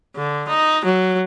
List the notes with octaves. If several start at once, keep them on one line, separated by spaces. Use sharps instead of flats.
D3
D#4
F#3